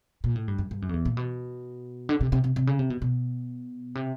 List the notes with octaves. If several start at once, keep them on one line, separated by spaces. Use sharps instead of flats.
A#2
A2
G2
F#2
G2
F#2
F2
E2
A#2
B2
D3
C3
C3
C3
C3
C#3
C3
B2
B2
C3